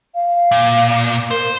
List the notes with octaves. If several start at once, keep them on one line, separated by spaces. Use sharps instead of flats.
F5
A#2
A#4 C5